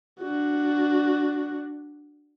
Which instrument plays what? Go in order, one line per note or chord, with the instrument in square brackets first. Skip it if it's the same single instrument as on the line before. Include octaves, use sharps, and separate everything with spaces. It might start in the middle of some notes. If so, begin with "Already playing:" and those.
[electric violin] D4 F#4